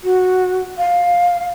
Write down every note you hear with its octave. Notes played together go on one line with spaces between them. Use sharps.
F#4
F5